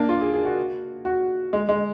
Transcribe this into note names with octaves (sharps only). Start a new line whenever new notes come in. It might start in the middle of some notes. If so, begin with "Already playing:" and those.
Already playing: A#3 D4
F4
G#4
G#4
F#4
F#4
G#3
G#3